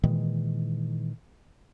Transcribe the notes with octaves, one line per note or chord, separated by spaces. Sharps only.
A#2 D#3 E3 G#3